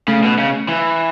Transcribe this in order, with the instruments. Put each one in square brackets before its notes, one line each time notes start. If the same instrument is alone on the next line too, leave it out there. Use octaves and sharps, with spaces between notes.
[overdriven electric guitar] C#3 [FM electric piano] A3
[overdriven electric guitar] B2
C#3
E3